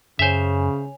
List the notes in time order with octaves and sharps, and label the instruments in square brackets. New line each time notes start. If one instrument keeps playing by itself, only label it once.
[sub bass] F#2 [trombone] C#3 [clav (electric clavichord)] C5 E5 [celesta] C#5 G#5 F7